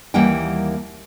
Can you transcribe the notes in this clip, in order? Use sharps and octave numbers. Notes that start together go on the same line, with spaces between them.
D#2 E3 G3 A#3 F#5 G5